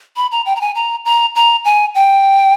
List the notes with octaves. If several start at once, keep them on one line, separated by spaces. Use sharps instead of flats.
B5
A#5
G5
A#5
G#5
A#5
A#5
A#5
G#5
G5